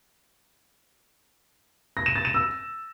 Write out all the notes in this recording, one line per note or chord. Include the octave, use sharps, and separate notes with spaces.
A#6
E7
A6
E7
E6